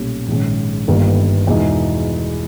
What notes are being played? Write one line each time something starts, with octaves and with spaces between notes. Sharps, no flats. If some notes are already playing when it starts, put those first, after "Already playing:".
Already playing: B1 A#2 G3 C#4
A#1 G#2 D#3 G#3 C#4
G1 G2 D#3 A#3
E2 B2 G#3 D#4